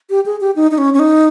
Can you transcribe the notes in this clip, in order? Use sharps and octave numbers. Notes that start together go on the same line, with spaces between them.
G4
G#4
G4
D#4
D#4
C#4
C#4
D#4